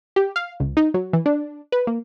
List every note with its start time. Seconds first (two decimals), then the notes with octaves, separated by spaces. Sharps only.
0.16 G4
0.36 F5
0.60 C#2
0.77 D#4
0.94 F#3
1.13 E3
1.26 D4
1.72 B4
1.87 A#3